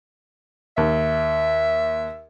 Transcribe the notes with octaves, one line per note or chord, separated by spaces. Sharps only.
D#2 E5